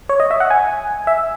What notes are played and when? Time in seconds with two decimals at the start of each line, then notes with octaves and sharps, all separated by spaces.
0.09 C#5
0.20 D#5
0.31 E5
0.40 F#5
0.50 G#5
1.07 E5